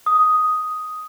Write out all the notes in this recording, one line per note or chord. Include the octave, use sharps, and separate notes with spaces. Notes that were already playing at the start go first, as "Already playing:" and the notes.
D#6